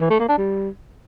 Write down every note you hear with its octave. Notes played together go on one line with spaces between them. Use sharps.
E3
A3
A#3
D4
G3